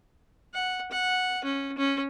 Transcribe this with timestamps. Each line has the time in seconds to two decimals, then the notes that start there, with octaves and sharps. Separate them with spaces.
0.54 F#5
0.91 F#5
1.44 C#4
1.78 C#4